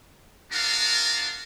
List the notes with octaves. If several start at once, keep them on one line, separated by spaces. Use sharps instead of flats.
B3 D4 F4 F#4 A#4 F5